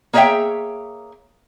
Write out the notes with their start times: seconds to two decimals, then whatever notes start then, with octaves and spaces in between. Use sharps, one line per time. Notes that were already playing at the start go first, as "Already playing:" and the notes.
0.13 A#3 G#4 C#5 D#5 E5 G5